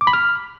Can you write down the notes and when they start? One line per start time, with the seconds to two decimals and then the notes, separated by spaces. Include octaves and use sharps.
0.01 D6
0.07 B5
0.13 F6